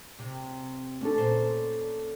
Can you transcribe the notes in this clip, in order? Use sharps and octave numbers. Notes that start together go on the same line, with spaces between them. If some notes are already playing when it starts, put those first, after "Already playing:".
C3
D2 C#4 D4 A4
A#2 C5